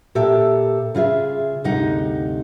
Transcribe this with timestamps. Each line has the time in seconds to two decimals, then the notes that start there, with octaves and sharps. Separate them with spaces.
0.15 A#2 G4 A4 E5
0.95 C#3 F4 G#4 E5
1.64 D2 G2 C3 D#4 F#5